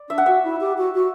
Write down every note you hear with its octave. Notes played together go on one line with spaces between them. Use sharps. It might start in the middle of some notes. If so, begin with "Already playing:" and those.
Already playing: D5
D4 E5
F#5
F#4 E5
E4
G4
F#4
F#4